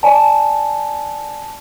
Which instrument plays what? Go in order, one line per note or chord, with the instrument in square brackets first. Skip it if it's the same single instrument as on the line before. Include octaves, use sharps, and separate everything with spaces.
[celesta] D5 G#5 A5